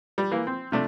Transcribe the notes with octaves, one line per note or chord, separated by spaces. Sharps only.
G3
E3 A#3
C4
C3 A3 D4